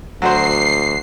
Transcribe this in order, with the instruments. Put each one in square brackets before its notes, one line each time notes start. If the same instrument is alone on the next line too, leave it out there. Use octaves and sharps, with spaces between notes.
[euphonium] D2 [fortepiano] F#3 F#4 C5 [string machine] C7